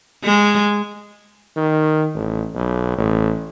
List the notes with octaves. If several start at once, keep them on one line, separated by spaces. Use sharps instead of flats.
G#3
D#3
A1
B1
A1